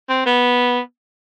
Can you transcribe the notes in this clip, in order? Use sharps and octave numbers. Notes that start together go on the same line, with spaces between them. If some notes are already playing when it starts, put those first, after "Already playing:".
C4
B3